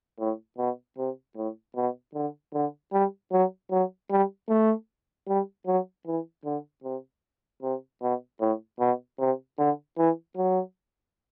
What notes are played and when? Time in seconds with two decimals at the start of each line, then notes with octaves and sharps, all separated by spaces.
0.19 A2
0.58 B2
0.98 C3
1.36 A2
1.76 B2
2.15 D3
2.54 D3
2.93 G3
3.32 F#3
3.71 F#3
4.11 G3
4.49 A3
5.28 G3
5.66 F#3
6.07 E3
6.45 D3
6.84 C3
7.63 C3
8.02 B2
8.40 A2
8.80 B2
9.20 C3
9.58 D3
9.98 E3
10.37 F#3